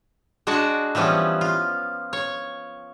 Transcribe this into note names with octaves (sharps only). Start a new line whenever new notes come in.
G#3 D4 F#4 F#5 A5
E3 F3 G3 B3 C#4
F4
C#5